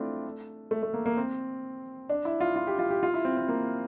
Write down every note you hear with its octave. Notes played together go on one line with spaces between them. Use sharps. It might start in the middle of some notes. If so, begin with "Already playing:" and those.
Already playing: A3 C4 D4 E4 F4
A3
A3
A#3
A#3
C4
D4
E4
F4
F4
G4
F4
G4
F4
E4
C4
C4
A#3